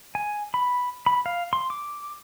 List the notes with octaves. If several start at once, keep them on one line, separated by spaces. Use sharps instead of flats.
G#5
B5
B5
F5
C6
D6